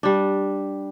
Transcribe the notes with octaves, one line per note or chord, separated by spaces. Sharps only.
G3 D4